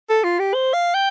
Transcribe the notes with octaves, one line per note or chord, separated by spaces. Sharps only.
A4
F4
G4
C5
F5
G5